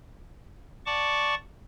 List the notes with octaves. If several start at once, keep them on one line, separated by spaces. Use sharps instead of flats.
D5 F#5 A5 C#6 D6